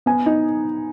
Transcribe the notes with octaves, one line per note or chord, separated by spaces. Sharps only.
B3 G#5
D#4